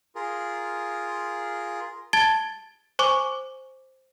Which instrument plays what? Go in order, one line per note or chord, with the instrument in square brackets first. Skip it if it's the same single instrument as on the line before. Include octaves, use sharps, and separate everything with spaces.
[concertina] F4 G#4 A#4
[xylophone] A5 G#6 A6 G7
C5 G#5 C#6 D6